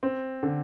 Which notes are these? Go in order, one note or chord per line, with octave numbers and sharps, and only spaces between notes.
C4
D3